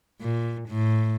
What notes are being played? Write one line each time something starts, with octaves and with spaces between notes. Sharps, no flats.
A#2
A2